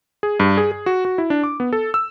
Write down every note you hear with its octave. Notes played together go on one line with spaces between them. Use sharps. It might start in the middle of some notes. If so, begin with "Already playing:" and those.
G#4
G2
G#4
G#4
F#4
F#4
E4
D4
D6
B3
A4
E6